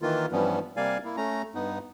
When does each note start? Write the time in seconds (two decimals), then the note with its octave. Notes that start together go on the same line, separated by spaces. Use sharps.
0.02 D#3 E3 A#3 F4
0.32 G2 E3 F3 G3 B3 C#4
0.77 C3 G3 A#3 D5 F5 G#5
1.05 A#3 E4
1.17 A3 C#4 A#5
1.55 G2 B3 D#4